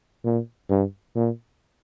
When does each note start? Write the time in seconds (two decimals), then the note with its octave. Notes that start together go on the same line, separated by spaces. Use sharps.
0.25 A#2
0.69 G2
1.15 A#2